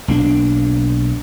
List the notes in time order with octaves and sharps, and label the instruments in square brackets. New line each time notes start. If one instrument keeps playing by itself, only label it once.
[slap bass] B1 A#3 D4